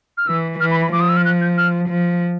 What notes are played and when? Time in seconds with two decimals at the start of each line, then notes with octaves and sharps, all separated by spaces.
0.17 F6
0.27 E3 E6
0.60 E3 F6
0.71 B5
0.82 B5
0.92 F3 D6
1.01 D#6
1.09 E6
1.17 F6
1.25 F#6
1.41 G6
1.58 F6
1.89 F3